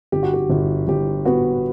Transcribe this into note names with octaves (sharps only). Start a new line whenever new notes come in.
G1 G4
F#4
G4
G1
G1 G4
B3 F#4